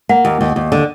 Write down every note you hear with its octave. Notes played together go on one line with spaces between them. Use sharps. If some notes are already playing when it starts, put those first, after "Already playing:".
A#3 F#5
D#2
D#2
D#2
D3